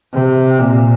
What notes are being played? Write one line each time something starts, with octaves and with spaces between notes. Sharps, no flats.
C3
A#2